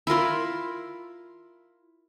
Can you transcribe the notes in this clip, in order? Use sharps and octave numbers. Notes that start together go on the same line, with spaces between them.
E4 F4 A#4 C6